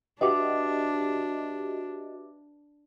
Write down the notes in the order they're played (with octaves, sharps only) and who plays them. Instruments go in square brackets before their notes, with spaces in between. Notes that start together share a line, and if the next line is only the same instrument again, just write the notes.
[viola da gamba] D4 [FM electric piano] F#4 G4 D#5 [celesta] B4 E5 D6